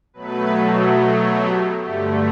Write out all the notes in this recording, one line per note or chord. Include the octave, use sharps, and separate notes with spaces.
B2 F#3 A3 B4
G4
G2 D3 A3 G4